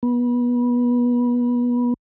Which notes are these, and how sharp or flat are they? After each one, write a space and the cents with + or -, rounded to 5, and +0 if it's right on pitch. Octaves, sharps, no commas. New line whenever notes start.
B3 -25